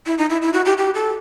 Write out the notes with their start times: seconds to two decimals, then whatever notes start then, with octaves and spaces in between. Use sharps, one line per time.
0.06 E4
0.18 D#4
0.30 E4
0.42 E4
0.53 F#4
0.65 G4
0.78 G4
0.95 A4